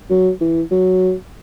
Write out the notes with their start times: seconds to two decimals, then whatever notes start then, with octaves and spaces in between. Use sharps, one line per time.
0.10 F#3
0.41 E3
0.71 F#3